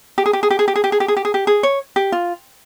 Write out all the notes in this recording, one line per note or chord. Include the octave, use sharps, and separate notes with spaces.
G4
G#4
G4
G#4
G4
G#4
G4
G#4
G4
G#4
G4
G#4
G4
G#4
G4
G#4
C#5
G4
F4